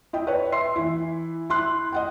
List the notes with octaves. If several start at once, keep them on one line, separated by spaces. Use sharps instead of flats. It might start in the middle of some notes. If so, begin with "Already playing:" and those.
E4 D#5 G5
B4 C#5
E5 C6 C7
E3 E4
E4 C6 F#6
D#5 F#5 G5